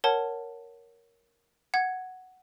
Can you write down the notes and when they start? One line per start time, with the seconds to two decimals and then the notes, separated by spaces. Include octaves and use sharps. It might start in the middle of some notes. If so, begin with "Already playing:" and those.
0.04 A#4 C#5 F#5 A5
1.74 F#5 G#6